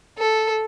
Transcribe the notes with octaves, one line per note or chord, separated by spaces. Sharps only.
A4